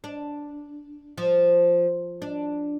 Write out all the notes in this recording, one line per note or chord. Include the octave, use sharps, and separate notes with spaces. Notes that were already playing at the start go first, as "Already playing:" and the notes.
D4
F3
D4